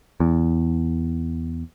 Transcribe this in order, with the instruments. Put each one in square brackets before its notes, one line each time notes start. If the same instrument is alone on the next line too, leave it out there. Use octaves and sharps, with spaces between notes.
[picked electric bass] E2